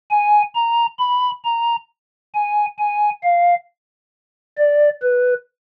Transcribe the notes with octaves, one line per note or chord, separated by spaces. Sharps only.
G#5
A#5
B5
A#5
G#5
G#5
F5
D5
B4